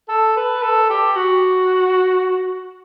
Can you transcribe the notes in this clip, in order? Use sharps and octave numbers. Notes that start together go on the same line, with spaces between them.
A4
B4
A4
G4
F#4